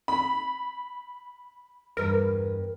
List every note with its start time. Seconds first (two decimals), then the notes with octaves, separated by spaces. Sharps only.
0.08 B5
1.97 E2 G2 A#4 B4